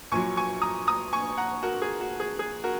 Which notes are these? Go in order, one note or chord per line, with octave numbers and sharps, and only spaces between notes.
A#1 A#2 F#3 G#5 C#6
G#5 C#6
A#5 D#6
A#5 D#6
G#5 C#6
F#5 A#5
F#4 A#4
G#4
F#4
G#4
G#4
F#4 A#4